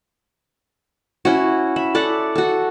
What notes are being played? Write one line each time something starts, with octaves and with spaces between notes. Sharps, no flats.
C#4 E4 F#4
E5 B5
A4 D5 E5 F#5
F#4 A4